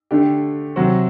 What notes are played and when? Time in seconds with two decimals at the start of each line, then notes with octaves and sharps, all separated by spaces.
0.11 D3 A3 D4 G4
0.76 C3 F#3 C4 F#4